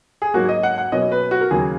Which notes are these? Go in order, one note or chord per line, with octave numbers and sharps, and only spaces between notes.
G#4
G#2 F#3 A#3 C#4 F#4
D#5
F#5
F#5
B2 F#3 A#3 C#4 D#5
B4
F#4
A#4
D#2 C#3 F#3 A#3 G#4